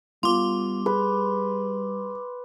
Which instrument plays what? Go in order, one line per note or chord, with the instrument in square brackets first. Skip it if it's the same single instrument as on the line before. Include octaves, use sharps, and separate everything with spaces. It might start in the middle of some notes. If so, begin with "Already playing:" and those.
[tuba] G3 [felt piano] B3 F4 [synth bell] C6 D6
[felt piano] G#4 [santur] B4